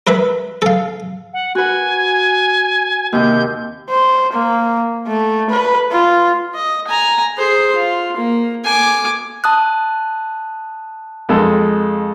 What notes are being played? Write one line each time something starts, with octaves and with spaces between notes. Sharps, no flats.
A#4 B4 E5 B5
A4 F5
F#5
F#4 B4 G#5
D#2 C3 G6
C5
A#3
A3
B4
F4
D#5
G#5 A#5
G#4 C5
F4
A#3
G#5 D6
A5 D#6 F#6
F2 G#3 A4